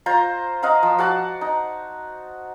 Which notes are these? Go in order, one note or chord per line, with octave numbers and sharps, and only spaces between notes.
F4 C5 A#5
D#5 F5 F#5 A#5
F3
F#4 F#5 A5 D6
D#4